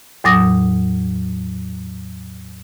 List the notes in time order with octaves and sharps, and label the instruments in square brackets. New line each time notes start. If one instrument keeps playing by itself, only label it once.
[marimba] E2 A2 F#3 D6 D#6 A#6